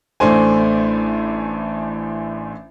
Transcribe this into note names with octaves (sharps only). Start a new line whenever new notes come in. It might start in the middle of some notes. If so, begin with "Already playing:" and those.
A1 A3 D4 C5 G#5